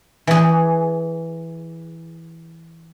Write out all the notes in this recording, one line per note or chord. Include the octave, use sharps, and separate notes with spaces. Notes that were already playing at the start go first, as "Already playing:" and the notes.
E3 G#4